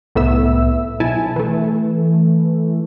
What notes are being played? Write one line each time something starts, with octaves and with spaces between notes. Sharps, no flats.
C2 A2 A3 B3 E5 E6
B1 E4 G#5 A5
E3 A3